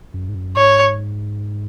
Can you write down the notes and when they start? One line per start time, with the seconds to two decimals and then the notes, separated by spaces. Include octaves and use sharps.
0.14 F#2
0.29 G#2
0.35 F#2
0.56 G#2 C#5